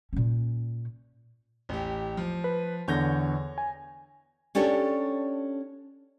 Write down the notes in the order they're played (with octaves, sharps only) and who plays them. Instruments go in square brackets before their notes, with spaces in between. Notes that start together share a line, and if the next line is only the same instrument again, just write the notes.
[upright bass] A#2 C#4
[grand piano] A1 G4
F3
[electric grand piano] B4
[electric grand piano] E2 D3 [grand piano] C#5 G6 A#6
[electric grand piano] G#5
[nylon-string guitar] C#4 D4 G4 A4 C#5